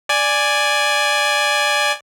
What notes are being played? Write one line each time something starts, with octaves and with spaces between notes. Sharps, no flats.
D5 G#5